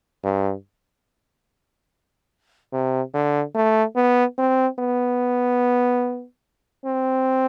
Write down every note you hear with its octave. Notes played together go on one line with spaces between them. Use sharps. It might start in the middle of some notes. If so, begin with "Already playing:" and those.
G2
C3
D3
A3
B3
C4
B3
C4